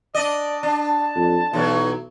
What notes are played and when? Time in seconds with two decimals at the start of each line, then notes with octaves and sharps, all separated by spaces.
0.15 D4 D5 D#5
0.63 D4 A5
1.15 F2
1.53 B1 E3 F#3 G3